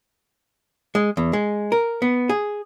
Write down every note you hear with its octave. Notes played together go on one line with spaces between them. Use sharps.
G#3
E2
G#3
A#4
B3
G#4